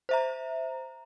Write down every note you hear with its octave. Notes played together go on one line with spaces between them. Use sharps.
C5 E5 A#5